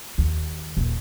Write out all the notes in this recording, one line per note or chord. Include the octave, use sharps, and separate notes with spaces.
D#2
D#1